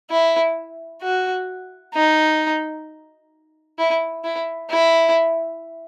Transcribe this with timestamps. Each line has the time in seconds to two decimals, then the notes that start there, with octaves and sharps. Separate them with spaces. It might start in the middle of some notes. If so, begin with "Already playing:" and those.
0.11 E4
1.03 F#4
1.94 D#4
3.78 E4
4.24 E4
4.70 E4